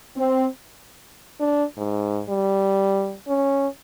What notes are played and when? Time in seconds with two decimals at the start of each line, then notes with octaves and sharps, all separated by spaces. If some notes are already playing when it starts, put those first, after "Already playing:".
0.17 C4
1.40 D4
1.77 G#2
2.29 G3
3.28 C#4